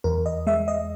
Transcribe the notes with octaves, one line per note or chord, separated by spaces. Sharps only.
E2 A#4
D#5
G#3 E5
D#5